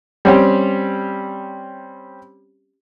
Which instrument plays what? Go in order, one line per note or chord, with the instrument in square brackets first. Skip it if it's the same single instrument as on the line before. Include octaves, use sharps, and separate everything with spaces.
[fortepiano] G3 C4 C#4 G4